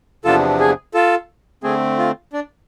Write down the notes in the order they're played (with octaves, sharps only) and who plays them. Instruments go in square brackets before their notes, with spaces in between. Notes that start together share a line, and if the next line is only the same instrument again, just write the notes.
[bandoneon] E2 C3 F3 B3 D4 [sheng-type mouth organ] F4 A4
[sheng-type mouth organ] G#4
F4 A4
[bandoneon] D3 A3 C4 [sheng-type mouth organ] G#4
[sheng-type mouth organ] F4
D4